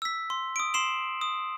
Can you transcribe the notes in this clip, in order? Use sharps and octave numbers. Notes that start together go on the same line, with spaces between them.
E6 B6
C6
D#6 D7
C6 C7 E7 F#7
D#6